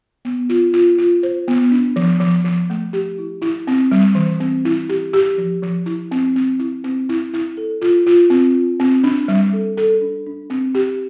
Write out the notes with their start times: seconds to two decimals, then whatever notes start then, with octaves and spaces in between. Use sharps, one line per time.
0.25 B3
0.49 F4
0.74 F4
0.98 F4
1.23 C5
1.48 B3
1.72 D4
1.96 F3
2.20 F3
2.44 F3
2.70 A3
2.93 G4
3.18 E4
3.42 E4
3.67 C4
3.91 G3
4.15 E3
4.40 C4
4.65 E4
4.89 G4
5.13 G4
5.38 F3
5.63 F3
5.86 E4
6.11 C4
6.36 C4
6.59 E4
6.84 C4
7.09 E4
7.34 E4
7.57 A4
7.82 F4
8.07 F4
8.30 C4
8.55 F4
8.80 C4
9.04 D4
9.28 G3
9.53 A4
9.77 A4
10.01 D4
10.26 D4
10.50 C4
10.75 G4